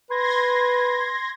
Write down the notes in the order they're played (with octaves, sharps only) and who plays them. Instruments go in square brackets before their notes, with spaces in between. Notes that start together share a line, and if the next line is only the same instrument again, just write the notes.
[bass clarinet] B4 [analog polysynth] C6 G#6 A#6